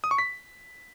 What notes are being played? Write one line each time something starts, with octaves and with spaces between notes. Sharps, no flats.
D#6
C#6
B6